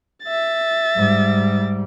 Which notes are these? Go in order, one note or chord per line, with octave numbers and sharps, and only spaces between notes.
E5 A6
G#2 G3